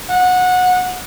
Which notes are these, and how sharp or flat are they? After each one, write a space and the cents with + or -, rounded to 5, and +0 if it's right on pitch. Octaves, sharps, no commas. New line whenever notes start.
F#5 -20